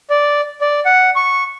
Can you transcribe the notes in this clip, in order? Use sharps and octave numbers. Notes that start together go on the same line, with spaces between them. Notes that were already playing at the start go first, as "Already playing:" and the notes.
D5
D5
F#5
C#6